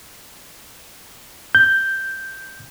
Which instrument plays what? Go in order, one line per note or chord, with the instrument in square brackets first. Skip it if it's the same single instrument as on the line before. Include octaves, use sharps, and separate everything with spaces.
[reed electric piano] G6